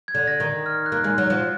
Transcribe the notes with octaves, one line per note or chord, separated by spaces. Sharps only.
G#6
D3
A#6
D#3
G#6
F6
F#6
A#3
G#3 F#6
F#3
F#6
F3